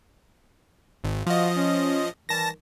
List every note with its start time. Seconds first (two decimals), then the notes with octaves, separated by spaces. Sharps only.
1.04 G#1
1.27 F3 F#4 D#5 F5
1.55 C#4
2.29 D#3 E3 G3 A5 A#6